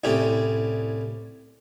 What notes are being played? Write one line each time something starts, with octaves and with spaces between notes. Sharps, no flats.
C2 A2 C#4 G4